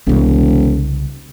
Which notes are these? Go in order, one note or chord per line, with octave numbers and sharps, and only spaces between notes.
E1 C2 C#3